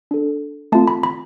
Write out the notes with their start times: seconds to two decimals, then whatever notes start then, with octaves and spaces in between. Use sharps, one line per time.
0.11 D4 A4
0.72 A3 C4 F4 A5
0.88 B5
1.03 B5